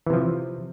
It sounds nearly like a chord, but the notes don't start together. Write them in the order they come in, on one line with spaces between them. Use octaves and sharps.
E3 C3 F3